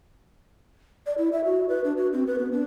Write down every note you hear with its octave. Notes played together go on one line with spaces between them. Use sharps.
D5
E4
E5
F#4
B4
D4
F#4
C4
B4
B3
D4